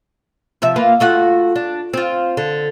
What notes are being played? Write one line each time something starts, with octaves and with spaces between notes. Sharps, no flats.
C3 F3 E5
A#3 F4 B4
A3 F4 F#4
D4
C4 F4
D3